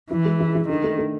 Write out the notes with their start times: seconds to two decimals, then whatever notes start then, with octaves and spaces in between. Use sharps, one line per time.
0.11 E3 E4
0.25 G#3
0.40 E4
0.55 E4
0.69 D3 D#3
0.84 A3
0.98 A3